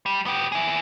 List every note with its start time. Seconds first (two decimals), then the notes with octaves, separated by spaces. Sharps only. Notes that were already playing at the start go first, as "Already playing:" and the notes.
0.06 G3
0.26 B3 G4
0.52 E4 G#4